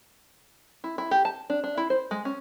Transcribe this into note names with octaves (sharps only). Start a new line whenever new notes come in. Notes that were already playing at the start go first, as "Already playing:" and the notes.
E4
E4
G4
A5
D4
D4
E4
C5
G#3
C#4